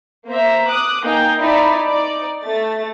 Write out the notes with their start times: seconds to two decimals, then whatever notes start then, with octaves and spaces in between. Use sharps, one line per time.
0.27 A#3 C5 E5 A#5
0.68 D6 D#6 F#6
1.03 A#3 D#4 D#5 F5 G5 G#5
1.38 D#4 E4 D5 A5 B5
1.88 D#4 D5
2.43 A3 A6